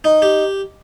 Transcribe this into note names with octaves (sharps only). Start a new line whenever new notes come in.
D#4
G4